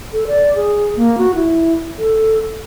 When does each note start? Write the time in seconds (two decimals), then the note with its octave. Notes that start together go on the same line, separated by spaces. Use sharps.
0.13 A4
0.27 D5
0.55 G#4
0.96 A#3
1.18 F#4
1.35 E4
1.99 A4